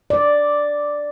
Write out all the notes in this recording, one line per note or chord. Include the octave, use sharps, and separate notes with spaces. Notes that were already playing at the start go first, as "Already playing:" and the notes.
D5